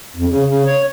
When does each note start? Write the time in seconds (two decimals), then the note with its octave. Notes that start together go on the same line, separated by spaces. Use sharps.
0.16 F2
0.30 C#3
0.47 C#3
0.66 C#5